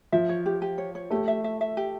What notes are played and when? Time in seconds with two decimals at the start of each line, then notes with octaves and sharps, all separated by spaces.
0.12 F3 E5
0.29 C#5
0.46 G4
0.62 G4
0.78 C#5
0.95 C#5
1.10 A3 G4
1.28 E5
1.44 E5
1.61 E5
1.77 G4